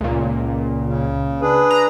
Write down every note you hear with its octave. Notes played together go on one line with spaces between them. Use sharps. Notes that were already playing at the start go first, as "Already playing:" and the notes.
C#2 A#2
C#3
D4 G#4 B4
A#5